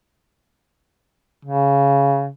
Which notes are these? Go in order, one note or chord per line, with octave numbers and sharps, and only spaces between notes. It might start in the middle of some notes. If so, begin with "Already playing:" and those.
C#3